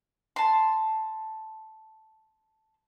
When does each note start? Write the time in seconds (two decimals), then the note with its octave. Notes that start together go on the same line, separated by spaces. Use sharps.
0.36 A5 C6